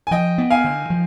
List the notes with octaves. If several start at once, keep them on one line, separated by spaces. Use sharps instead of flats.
G#5
F3 D#5 G5
B3
F5 G#5
D3
F3